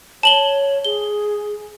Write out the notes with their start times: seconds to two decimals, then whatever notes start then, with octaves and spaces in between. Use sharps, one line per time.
0.23 C#5 A5 F#7 G7
0.85 G#4 G7